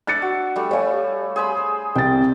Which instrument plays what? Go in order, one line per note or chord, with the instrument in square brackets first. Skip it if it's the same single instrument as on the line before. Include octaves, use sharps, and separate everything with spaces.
[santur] D4 E5 [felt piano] F#6 A6 C#7
[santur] F#4
G3 A3
[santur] G3 A3 [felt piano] C#5 F5 G#5
[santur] G#4 C5 B5
[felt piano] C2 A6 [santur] G5